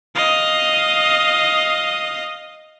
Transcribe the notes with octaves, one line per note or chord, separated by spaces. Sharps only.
D#5 F5